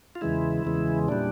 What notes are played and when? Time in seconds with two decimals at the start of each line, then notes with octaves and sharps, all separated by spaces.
0.15 F4
0.21 E2 C#3 E3 G#3 E4
0.65 E2 C#3 E3 G#3
1.08 A#2 G3 D4